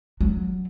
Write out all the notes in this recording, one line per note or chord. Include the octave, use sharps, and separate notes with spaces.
F#3